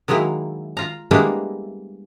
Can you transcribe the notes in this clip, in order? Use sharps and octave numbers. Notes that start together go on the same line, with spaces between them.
D#3 F#3 G#3 A#3 E4
F4 A#5
G3 G#3 A#3 B3 D4 E4